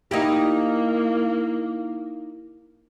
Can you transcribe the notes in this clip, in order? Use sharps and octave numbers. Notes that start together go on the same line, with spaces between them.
A#3 D#4 E4 G4